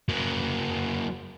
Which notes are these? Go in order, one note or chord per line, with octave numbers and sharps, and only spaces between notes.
F#3 A#3